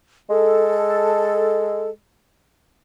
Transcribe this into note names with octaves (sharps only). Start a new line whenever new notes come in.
G#3 A4